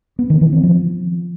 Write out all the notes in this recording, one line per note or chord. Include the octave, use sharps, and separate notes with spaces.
B3
D#3
E3
C4
F3